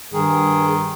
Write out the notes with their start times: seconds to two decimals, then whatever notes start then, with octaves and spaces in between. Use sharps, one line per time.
0.13 G2 D#3 G#4